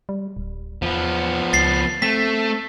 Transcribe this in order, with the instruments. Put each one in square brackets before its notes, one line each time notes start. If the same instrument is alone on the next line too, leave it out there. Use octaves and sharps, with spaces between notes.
[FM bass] G3
D1
[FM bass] E2 [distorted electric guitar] F3 B3
[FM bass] C#2 [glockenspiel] A6 C7
[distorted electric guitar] A3 [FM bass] C4 [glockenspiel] B6